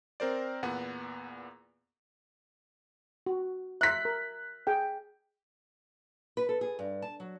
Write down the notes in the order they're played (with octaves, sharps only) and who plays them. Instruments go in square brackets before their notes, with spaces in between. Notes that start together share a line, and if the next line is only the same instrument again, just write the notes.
[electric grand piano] C4 A#4 C5 D5
E2 A#2 B3 F#5
[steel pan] F#4
[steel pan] E5 C6 [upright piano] F#6 B6
[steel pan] A#4
G#4 G5
[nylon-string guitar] B4
A4
G#4
G2
A5
F#3